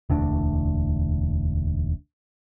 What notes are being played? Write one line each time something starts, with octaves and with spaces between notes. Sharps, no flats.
E1 D2 D4